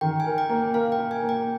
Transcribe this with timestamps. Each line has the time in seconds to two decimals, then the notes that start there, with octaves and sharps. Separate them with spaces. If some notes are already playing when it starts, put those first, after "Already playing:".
0.01 D#3 G5
0.20 G#5
0.26 A#4
0.38 G5
0.49 A#3
0.74 A#4 F5
0.92 G5
0.98 A#4
1.11 G#5
1.23 A#3
1.29 G5